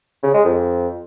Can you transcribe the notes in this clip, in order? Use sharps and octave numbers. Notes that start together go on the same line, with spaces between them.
C#3
G#3
F2